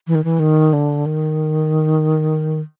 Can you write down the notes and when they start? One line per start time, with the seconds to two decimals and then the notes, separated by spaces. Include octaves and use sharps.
0.07 E3
0.15 D#3
0.24 E3
0.40 D#3
0.73 D3
1.06 D#3